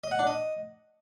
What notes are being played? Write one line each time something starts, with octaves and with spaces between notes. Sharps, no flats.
D#5
F#5
D4
D#5